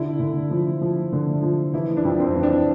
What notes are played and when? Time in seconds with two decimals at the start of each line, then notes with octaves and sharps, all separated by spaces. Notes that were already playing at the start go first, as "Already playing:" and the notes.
Already playing: D3 E4
0.20 D3
0.51 F3
0.81 F3
1.12 D3
1.43 F3
1.74 E3 E4
1.97 D4
2.05 F2
2.20 C4
2.35 E3
2.43 D4